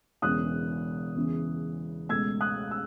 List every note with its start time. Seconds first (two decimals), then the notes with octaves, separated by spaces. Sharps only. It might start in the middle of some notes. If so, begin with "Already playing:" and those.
0.22 E1 E2 C#3 E3 B3 D#6 F#6
1.15 E2 C#3 E3
2.09 C#2 B2 A3 E6 G#6
2.41 D#6 F#6
2.71 E6